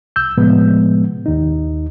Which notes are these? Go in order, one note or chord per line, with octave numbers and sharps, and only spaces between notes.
C2 E6 G6
A2 C3 F3 G#3 B3
D#2 D#4